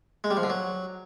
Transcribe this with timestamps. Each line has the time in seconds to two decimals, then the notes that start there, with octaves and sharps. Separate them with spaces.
0.24 G#3
0.31 G3
0.37 F3
0.43 D3
0.50 F#3